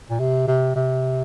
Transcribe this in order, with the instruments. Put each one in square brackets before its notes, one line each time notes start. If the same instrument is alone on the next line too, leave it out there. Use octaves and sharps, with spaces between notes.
[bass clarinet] A#2
C3
C3
C3